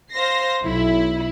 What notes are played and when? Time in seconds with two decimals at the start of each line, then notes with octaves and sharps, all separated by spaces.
0.13 C5 F5 A#6 C7
0.65 B1 E4